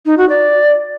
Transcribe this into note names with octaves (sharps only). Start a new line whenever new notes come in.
D#4
F#4
D5